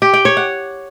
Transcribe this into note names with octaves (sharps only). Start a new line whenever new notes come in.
G4
G5
C#5
F#5